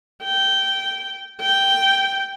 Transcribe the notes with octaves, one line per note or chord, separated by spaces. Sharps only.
G5
G5